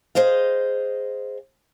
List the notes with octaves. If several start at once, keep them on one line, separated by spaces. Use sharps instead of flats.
G#4 C5 D#5 F5